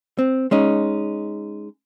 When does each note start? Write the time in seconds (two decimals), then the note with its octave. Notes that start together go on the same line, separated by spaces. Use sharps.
0.19 C4
0.51 G#3 C#4 D#4